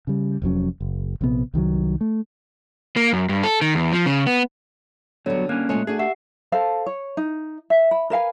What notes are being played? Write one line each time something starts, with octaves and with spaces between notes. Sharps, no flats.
C#3 G3
F1 F2 F#3 C#4
F#1
A#1 C3 B3
C2 D#3 F3 F#3
A3
A#3
F#2
G2
A4
D#3
E2
F3
C#3
B3
D3 F#3 G3 B3 F#4 C#5
A#3 C#4 F#6
A#2 G#3 A3 C#4 C#5
A3 D4 F#4 G#4
G4 E5 F#5 C7
A4 C5 F5 A5
C#5
D#4
E5
B5
A#4 B4 F5 G#5